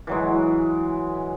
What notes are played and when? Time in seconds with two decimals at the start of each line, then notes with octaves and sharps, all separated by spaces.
0.07 E3 F#3 G#3